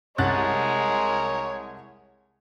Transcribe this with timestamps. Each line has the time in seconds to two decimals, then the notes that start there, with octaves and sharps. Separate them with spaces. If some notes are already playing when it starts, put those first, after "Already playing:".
0.18 C2 G#3 A#4 C#5 F#6 A6